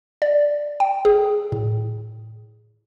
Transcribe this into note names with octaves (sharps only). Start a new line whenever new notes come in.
D5
G5
G#4
A2